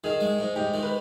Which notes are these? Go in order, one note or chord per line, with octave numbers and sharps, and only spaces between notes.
D#3 G#4
G#3
G#2
G#2 G4
D#3
B4